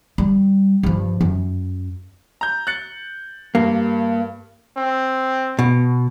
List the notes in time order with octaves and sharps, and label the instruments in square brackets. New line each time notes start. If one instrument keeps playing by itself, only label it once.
[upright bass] G3
G2 F3
F#2
[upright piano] A#5 G6
F#6 A6 C#7
[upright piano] G2 [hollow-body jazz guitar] A#3
[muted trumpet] C4
[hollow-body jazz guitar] B2